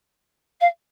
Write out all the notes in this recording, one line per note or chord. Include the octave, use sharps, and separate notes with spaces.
F5